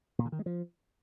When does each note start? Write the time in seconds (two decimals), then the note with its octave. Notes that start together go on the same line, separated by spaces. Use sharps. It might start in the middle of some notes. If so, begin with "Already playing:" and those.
0.19 A#2
0.26 D3
0.32 D#3
0.39 G#3
0.46 F3